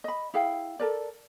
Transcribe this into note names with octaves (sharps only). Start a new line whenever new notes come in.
D#5 B5
E4 G#4 F5 G5
A4 A#4 D5